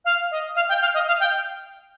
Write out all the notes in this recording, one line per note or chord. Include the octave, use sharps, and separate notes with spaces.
F5
D#5
F5
G5
F5
D#5
F5
G5